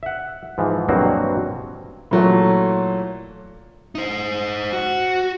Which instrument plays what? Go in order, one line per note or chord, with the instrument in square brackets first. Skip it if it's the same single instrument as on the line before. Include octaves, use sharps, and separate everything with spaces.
[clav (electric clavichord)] E5 F#5
G#2 E3 F3
G2 B2 F#3 A#3 C4 F#4
[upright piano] A#2 E3 F#3 A3
[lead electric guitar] D#4 C5
F#4